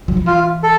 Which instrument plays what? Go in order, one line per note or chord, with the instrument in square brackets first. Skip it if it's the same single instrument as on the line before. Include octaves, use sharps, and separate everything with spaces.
[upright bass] F#3
F3
[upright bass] E3 [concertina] F4
[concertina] A4